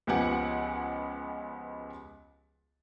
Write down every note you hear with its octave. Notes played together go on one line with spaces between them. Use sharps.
C#2 F3 B3 G4 F#5 G#5